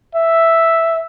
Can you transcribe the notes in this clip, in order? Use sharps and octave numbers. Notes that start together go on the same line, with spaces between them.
E5